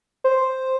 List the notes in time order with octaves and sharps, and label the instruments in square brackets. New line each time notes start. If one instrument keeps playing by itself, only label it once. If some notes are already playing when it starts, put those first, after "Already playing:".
[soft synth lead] C5